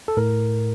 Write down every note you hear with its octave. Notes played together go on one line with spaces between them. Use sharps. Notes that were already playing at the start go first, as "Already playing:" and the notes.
A4
A2 A#4